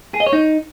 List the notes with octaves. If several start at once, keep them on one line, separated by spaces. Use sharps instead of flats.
G#4
D#5
C#5
D#4